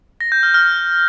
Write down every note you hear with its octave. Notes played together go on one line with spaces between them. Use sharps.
A#6
G6
F6
F6